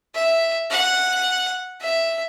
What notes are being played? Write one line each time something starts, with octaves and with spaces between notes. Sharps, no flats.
E5
F#5
E5